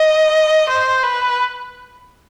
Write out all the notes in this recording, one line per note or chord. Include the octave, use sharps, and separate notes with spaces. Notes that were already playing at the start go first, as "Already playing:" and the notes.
Already playing: D#5
C5
B4